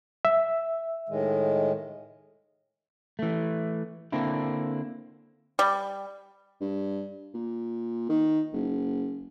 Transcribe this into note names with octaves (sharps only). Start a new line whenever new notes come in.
E5
A2 D#3 G#3
E3 A3
D3 A#3 C4 D4 E4
G3
G2
A#2
D#3
F#1